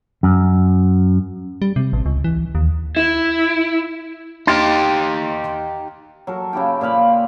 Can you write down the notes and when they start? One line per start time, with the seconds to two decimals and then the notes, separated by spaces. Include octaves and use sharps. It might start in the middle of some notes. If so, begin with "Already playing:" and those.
0.23 F#2
1.62 G3
1.76 C3
1.93 A1
2.06 C#2
2.24 E3
2.55 D#2
2.96 E4
4.47 D#4 G4 C6 F6 A6
6.27 F#3 A4 A#4
6.53 C#3 E4 G4 G5
6.81 A#2 B4 F5 B5